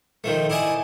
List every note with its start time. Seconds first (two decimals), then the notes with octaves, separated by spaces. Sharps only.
0.24 D#3 F3 A3
0.50 E4 D5 D#5 G#5 A5